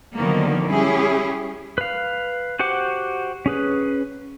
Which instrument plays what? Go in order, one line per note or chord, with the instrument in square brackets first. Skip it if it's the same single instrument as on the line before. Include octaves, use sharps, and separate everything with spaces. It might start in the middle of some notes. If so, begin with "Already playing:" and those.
[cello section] D3 D#3 F3 F#3 A#3 B3
G3 C#4 E4 G4 G#4
[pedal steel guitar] B4 F5
F#4 G4 C5 F#5 D6
C#4 G#4 B4